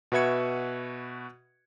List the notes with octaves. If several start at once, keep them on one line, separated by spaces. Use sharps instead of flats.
B2 F#4 B4 E5 G#6 C#7